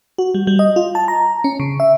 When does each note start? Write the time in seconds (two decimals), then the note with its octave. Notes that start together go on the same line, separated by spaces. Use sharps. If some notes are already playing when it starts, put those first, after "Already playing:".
0.18 F#4
0.34 G3
0.47 G3
0.59 D#5
0.76 F4
0.95 A5
1.08 A#5
1.44 C#4
1.60 C#3
1.80 E5